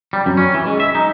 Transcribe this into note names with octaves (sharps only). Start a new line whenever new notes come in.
G3
F#2
C#4
E3
G#3
E5
D#4